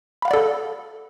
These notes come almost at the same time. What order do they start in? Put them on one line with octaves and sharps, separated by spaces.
B5 F5 F#5 D5 A4